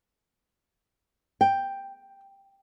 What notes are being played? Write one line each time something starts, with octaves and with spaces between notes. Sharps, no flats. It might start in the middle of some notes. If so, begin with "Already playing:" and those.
G5